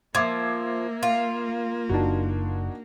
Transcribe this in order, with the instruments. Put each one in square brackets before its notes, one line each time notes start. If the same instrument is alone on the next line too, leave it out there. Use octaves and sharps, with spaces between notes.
[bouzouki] F3 [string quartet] A#3 [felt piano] E5 D6 G#6
[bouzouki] F4
[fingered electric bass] F#1 [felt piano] D4 D#4 F#4